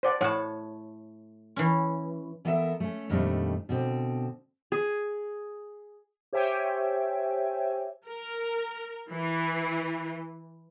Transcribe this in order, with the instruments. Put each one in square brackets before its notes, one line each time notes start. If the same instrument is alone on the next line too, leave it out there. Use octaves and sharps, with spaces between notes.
[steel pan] C5 D5 F#5
[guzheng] A2 A5 [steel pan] C#5 F#5
[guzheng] E3 C#4
[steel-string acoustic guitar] E3 B3 A4 A#4 D5 E5
A3 C#4
F2 A#2 D#3 G3 A3 D4
B2 D3 C4
[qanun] G#4
[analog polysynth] G4 C5 C#5 E5 G5 G#5
[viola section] A#4
E3